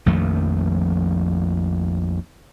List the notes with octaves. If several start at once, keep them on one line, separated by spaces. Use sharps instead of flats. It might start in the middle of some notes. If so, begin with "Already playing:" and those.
A#1 F2 D#3 A3